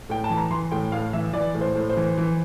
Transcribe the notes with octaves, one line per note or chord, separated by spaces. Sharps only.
A2 G5
A5
E3
A#5
E3 C6
A2 G5
A2 F5
E3 E5
E3 D5
A2
C5
A2
C5
E3
E3